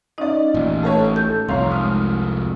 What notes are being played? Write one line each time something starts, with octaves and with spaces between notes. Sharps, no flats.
C#4 D#4 D5 D#5
A1 A#2
A3 A4 B4 C#5 A5
A4 G6
C2 F2 C#5 F5 A#5 C6
G#3 D#6 F6